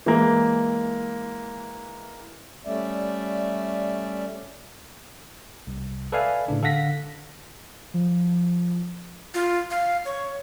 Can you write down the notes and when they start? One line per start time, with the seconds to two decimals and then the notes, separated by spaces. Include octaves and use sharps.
0.06 E3 G#3 A#3
2.65 G3 A3 C#4 D5 E5
5.67 C2
6.12 A4 B4 D5 E5 F5 G#5
6.48 A2 C#3 D4
6.62 D3 A4 F5 F#5 A#6 B6
7.94 F3
9.34 F4
9.71 F5
10.05 C#5